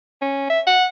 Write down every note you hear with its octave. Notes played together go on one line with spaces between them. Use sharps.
C#4
E5
F#5